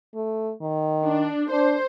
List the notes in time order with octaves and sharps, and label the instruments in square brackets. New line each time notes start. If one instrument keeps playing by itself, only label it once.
[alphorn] A3
D#3
[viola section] D4
[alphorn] D4 [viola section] C5